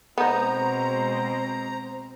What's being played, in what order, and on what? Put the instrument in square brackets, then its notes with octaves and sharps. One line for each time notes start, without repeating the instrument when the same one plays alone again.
[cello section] B2 G#3 C4 [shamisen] B3 D#4 [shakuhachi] C5 [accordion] A#5